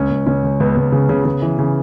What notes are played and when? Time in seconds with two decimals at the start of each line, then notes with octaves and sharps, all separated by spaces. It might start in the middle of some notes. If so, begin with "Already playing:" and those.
Already playing: C#2 C#4
0.10 C#2
0.27 C#2 C#4
0.44 C#2
0.60 C#2 B3
0.77 C#2
0.92 C#3
1.09 C#3
1.25 C#3
1.42 E3
1.59 C#3